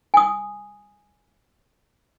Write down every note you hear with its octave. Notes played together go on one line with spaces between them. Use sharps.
G#5 D#6